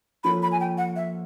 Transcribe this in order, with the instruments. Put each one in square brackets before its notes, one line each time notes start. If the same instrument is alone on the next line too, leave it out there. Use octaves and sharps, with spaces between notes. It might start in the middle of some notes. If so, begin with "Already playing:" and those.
[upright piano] F3 A#3 C#4 F4 A4 [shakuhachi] B5
[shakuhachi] B5
G#5
G5
F#5
E5